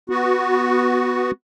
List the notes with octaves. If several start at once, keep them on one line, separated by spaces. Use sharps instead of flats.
B3 F#4